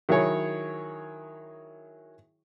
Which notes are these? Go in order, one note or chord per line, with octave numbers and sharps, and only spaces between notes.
D#3 F#3 E4 G#4 C#5